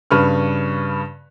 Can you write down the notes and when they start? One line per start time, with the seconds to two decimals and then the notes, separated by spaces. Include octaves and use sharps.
0.11 G2 C#3 B4 C#6 F6